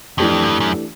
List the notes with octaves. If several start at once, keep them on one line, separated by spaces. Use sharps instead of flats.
F2 E3 A3 D4 G4
F#2
F2
F#2